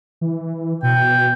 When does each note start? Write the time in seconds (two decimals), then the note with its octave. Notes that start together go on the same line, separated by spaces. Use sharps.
0.21 E3
0.83 B2 G5